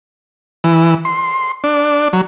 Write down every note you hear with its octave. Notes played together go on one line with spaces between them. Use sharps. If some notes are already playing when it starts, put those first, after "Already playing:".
E3
C6
D4
F#3